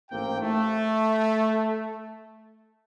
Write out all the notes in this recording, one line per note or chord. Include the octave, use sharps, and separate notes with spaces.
A1 G#2 A#3 C4 G4 G5
A3